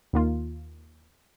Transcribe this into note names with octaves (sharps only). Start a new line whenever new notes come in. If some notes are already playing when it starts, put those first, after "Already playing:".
D#2 D#3 A#3 F4